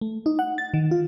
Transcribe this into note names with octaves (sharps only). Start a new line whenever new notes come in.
A3
D#4
F#5
A6
D#3
F4